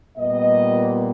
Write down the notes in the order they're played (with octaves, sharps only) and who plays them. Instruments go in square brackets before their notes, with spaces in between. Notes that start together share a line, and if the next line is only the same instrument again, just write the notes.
[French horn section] A#2 G3 B3 D#5